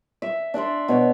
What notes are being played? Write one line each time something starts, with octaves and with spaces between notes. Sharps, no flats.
E5
D4 D5 E5 C6
B2 C#5